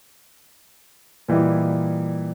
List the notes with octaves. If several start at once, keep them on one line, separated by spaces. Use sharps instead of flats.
A#2 E3 G3 E4 D#5